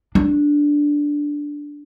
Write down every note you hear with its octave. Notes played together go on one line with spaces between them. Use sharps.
D4